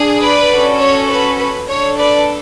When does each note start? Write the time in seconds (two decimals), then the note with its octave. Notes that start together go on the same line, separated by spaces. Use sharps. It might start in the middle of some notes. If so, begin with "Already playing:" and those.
Already playing: D4 G#4
0.20 B4 D5
0.49 C#4 F#4 A4
0.79 C#5
1.09 B4
1.38 B4
1.68 D4 A4 C#5
1.97 B4 D5